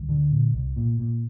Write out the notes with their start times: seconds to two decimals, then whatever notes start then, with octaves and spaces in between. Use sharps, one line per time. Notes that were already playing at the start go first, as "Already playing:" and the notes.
Already playing: D2 G3
0.09 D3
0.31 A#2
0.54 C2
0.76 A#2
1.00 A#2